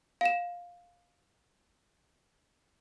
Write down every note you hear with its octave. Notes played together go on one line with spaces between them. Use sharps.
F5 E7